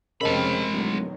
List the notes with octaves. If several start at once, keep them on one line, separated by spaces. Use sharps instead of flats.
F1 C#3 G#3 C4 A#4 D#5 A5 B5
D1 B2 D#3 F#3